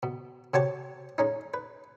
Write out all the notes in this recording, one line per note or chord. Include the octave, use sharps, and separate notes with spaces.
B2
C3 F#4 G4 C#5 A5 C#6
G#3 C#4 D#4
B4